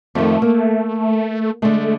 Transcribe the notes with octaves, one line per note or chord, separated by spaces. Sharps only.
F2 D#3 A3
A#3
D3 G#3 A3